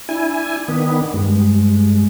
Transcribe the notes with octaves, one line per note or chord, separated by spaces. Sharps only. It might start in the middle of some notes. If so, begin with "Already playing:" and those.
D4 E4 G#5
D#3 B3
G2 G#3